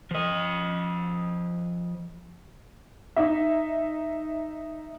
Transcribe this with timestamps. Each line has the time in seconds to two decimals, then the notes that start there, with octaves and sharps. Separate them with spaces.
0.11 F3 D#5
3.16 D#4 E5